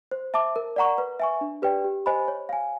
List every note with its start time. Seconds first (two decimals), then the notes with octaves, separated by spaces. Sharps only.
0.11 C5
0.34 E5 A5 D6
0.56 A#4
0.76 D5 F#5 A#5 C#6
0.98 B4
1.20 E5 G#5 C#6
1.41 D4
1.62 G4 B4 D5 G5
1.84 G4
2.06 C5 D#5 G#5 B5
2.28 C#5
2.49 F5 G#5